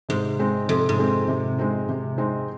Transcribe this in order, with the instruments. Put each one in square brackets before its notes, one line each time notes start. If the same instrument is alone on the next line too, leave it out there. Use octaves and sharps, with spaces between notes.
[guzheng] G#2 [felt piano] C3
[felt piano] G#3 C4 D#4
[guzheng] F2 [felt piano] C3
[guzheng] G#2
[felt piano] G#3 C4 D#4
C3
G#3 C4 D#4
C3
G#3 C4 D#4